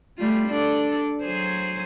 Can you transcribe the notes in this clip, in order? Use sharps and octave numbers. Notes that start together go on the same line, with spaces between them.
G3 A3 F4
D4 A4 D5
F#3 G#4 C5